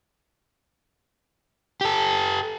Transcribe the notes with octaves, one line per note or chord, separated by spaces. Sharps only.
G4 A4